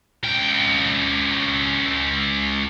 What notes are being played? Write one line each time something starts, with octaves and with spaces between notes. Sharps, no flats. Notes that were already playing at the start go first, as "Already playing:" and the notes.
C#2 G5